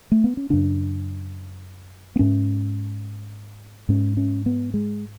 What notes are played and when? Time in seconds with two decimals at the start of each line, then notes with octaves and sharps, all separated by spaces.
0.12 A3
0.24 B3
0.37 C#4
0.50 F#2 C#3 D4
2.16 B3
2.19 G#2 C#4
3.89 G#2 C#4
4.17 C#4
4.46 B3
4.74 G#3